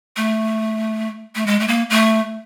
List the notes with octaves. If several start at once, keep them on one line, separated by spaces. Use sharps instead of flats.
A3
A3
G#3
A3
A#3
A3